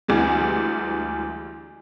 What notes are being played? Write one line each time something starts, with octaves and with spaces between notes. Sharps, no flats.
D2 E3 G3 G#3